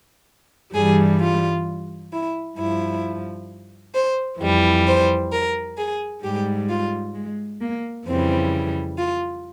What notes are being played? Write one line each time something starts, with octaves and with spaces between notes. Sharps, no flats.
G2 E3 G3 G#4
F4
E4
G2 F3 E4
C5
F2 E3 G3
C5
A#4
G#4
G#2 G3 G4
F4
G#3
A#3
F2 C#3 E3 G3 C4
F4